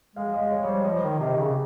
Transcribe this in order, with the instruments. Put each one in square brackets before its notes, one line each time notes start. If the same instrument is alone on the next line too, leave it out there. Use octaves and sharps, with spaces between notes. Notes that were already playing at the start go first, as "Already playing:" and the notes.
[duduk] G#3 [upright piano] F5
[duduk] G#3 [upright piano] D#5
[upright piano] C#5
[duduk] G3 [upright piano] C#5
[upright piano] C5
[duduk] F3 [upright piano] D#5
[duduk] D#3
[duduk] C3 [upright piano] D#5
[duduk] C#3